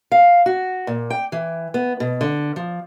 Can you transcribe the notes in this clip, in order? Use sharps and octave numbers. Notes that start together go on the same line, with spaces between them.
F5
F#4
A#2
G5
E3
B3
B2
D3
F3